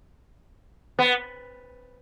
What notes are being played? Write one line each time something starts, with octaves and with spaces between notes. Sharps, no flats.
B3